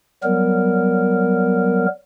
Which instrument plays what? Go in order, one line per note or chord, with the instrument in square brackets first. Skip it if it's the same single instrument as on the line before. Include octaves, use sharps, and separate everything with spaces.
[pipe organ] F#3 G3 B3 A#4